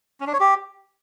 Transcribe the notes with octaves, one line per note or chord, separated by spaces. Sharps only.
C#4
D4
C#5
G4